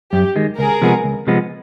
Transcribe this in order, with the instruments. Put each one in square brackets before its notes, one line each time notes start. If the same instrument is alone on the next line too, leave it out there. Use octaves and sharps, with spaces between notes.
[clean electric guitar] F#2 [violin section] G4
[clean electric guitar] D#3 G#3
[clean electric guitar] C#2 [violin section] G#4 A#4
[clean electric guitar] C3 F3 G#3 B3
C#2
C3 F3 G#3 B3